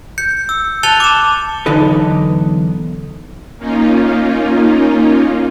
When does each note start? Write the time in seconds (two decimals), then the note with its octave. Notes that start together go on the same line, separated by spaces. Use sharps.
0.18 G6 C#7
0.49 E6
0.83 A5 F#6 A6 C#7 F7 G7
1.00 D6 E7
1.66 B1 E2 D3 D#4 A4 B4
3.57 A#3 C#4 D#4 F4